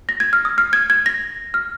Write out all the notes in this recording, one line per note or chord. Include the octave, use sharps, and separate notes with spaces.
A#6
G#6
F6
D#6
F6
G#6
G#6
A#6
F6